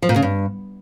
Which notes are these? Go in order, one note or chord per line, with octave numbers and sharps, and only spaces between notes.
F3
A#2
C#3
G2